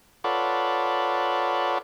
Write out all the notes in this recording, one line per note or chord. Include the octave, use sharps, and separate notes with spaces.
F4 A4 B4 C#5 D5 F#5